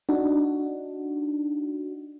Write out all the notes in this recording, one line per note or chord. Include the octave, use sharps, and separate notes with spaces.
D4 D#4 F#4